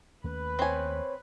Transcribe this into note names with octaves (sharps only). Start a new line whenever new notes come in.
D#2 A3 C#4 B4
C4 C5 C#5 G#5